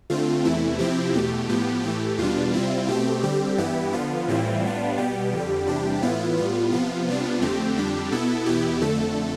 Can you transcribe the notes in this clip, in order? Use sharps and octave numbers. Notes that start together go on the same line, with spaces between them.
D3 A3 C4 F4
E2 C3 E3 A3 E4
C3 F3 C4 E4 G4
E2 B2 A3 G4
A2 F3 B3 G4
A2 E3 A3 G4
E2 B2 G3 D4 F4
C3 G3 C4 E4
B2 A3 C4 G4
D3 G3 C4 G4
G2 E3 B3 E4 G4
D3 F3 B3 F4
A2 E3 G3 C4 E4
A2 G3 B3 D4
B2 G3 B3 G4
F2 D3 G3
E2 C3 G3 D4
A2 E3 B3 E4 F4
A2 G3 B3
C3 F3 B3 F4
C3 G3 B3 D4
F2 D3 A3 C4 G4
F2 D3 G3 D4
B2 B3 E4 A4
E2 B2 B3 E4 G4
F2 D3 A3 A4